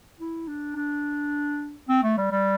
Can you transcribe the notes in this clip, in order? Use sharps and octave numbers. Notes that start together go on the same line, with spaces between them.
E4
D4
D4
C4
A3
G3
G3